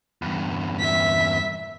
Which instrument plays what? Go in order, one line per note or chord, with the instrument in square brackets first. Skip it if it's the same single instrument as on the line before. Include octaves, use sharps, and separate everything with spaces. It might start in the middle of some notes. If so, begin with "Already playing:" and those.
[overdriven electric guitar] E2 G2
[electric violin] E5 B6